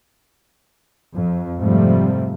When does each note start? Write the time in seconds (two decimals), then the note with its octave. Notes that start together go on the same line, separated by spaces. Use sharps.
1.15 F2
1.59 G#2 C3 F3 G3 A3